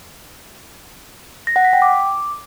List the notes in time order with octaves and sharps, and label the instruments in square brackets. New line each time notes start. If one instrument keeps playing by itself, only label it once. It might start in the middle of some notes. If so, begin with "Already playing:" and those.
[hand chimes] A#6
F#5
B6
G5
D6